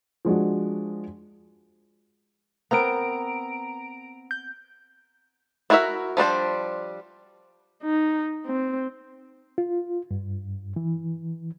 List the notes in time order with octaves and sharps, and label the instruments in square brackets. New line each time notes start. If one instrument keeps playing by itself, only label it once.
[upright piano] F3 G#3 D4 F#4
[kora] B3 C4 A#4 [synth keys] A#5 D7
[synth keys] G6
[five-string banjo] D4 E4 F#4 A#4 E5
F3 G3 D4 C5
[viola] D#4
C4
[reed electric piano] F4
G2
E3